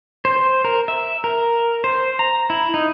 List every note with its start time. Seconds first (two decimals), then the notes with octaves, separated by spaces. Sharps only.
0.25 C5
0.65 A#4
0.88 E5
1.24 A#4
1.84 C5
2.19 A#5
2.50 E4
2.74 D#4